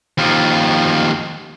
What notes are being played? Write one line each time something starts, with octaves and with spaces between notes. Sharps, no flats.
D#2 F3